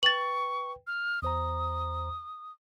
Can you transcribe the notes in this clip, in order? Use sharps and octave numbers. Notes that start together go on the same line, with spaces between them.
B4 G5 C#6 A6 F#7
F6
E2 C5 A#5 D#6